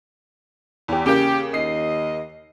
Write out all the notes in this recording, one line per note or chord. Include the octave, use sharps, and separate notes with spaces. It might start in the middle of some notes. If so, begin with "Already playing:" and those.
E2 G4
C#3 A#3 G4
D#2 D#5 C7